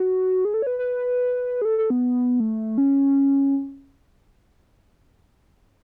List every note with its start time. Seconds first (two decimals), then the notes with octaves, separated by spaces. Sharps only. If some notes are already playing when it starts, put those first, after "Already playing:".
Already playing: F#4
0.45 G#4
0.54 A4
0.62 C#5
0.67 B4
0.79 B4
1.62 G#4
1.65 A4
1.78 A4
1.90 B3
2.40 A3
2.78 C#4